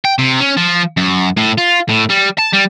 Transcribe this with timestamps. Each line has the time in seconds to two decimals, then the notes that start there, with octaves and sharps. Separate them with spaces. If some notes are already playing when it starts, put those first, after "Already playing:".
0.05 G5
0.19 C3
0.40 C#4
0.57 F3
0.97 F#2
1.37 A2
1.58 F4
1.89 A2
2.10 G3
2.38 A5
2.53 G3